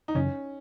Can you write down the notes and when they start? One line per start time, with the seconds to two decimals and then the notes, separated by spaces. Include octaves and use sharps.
0.08 D#4
0.15 F#2 C#3 E3 C#4